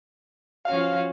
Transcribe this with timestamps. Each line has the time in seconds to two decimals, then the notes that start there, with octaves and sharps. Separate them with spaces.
0.65 F3 C#4 F#4 F5